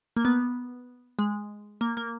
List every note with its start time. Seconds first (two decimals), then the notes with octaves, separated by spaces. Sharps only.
0.17 A#3
0.25 B3
1.19 G#3
1.81 A#3
1.97 A#3